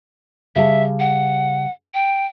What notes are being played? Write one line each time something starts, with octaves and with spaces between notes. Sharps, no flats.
C#3 G3 E5 A5
F#5
G5